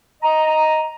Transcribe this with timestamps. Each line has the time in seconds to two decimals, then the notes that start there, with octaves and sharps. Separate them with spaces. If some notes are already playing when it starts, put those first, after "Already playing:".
0.23 D#5 A#5